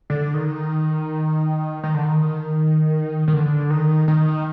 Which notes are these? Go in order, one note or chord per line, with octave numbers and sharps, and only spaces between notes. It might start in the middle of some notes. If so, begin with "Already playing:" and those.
D3
D#3
D#3
D3
D#3
D#3
D3
D#3
D#3